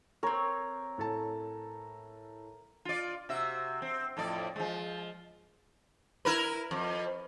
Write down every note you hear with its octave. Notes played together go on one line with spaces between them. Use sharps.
C4 A#4 C#5
A2 A4 A5
F4 D5
C3 F#4 E5
C4
F2 A2 D5
F3 G#3
E4 A#4 B4
F2